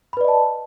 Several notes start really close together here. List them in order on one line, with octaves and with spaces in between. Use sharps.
B5 B4 D5 D#5 A5